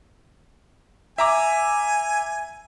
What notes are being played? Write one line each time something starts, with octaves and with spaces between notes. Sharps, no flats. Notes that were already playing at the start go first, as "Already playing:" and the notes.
E5 G#5 A#5 D6